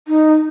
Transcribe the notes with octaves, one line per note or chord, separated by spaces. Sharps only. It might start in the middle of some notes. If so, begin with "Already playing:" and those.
D#4